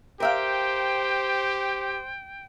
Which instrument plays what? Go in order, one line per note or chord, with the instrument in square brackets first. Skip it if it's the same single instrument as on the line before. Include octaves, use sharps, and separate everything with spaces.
[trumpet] G4 [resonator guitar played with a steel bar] A#4 E5 F5 [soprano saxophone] C5 [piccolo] G5